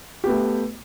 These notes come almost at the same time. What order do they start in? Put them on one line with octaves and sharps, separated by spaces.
G4 B3 A3